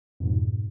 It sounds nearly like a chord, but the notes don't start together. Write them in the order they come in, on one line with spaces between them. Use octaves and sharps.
F2 B2 G#2